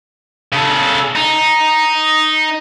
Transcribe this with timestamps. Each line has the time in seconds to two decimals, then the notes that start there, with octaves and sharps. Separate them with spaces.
0.52 C#3 A4
1.16 D#4